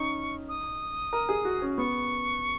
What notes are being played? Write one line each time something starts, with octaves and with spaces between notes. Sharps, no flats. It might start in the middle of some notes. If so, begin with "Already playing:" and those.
Already playing: C#4 D#4 C#6
D#6
A#4
G#4
F#4
C#4
B3 C#6